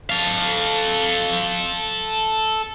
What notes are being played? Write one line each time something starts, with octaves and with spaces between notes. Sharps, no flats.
A4 F5